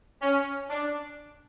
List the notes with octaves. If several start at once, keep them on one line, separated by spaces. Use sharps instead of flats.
C#4
D4